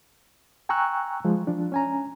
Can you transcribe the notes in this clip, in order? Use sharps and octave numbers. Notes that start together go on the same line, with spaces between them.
G5 G#5 A#5 C#6 E6 F#6
F3 G#3
F3 D4
C#4 G#5 A#5